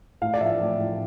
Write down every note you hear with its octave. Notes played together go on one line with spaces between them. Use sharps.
A2 F5
D5
F3 E5
A2
A2